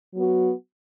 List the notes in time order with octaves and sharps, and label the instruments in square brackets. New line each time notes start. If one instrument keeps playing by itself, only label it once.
[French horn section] F#3 B3 F#4